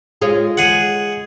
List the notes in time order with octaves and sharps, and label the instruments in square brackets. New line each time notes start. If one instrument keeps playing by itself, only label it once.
[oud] G#3 F4 C#5
[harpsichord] G#4 F#5